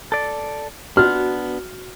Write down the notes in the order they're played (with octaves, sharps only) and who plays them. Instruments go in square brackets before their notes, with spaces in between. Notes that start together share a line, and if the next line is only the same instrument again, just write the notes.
[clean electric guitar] A4 D5
[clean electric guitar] B3 D4 [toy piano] F#4 [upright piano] F6